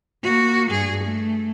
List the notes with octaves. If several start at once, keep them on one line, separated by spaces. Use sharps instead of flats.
A#3 F#4
G2 G#4
A3